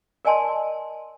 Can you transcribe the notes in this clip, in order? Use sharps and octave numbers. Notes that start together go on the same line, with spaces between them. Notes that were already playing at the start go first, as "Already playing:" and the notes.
A#4 D5 D#5 G#5 A5 C6